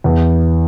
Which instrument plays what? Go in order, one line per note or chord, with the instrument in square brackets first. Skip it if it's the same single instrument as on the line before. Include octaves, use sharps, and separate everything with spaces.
[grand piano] E2